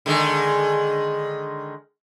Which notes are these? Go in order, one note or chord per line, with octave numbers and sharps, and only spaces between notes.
D3 D#3 G#3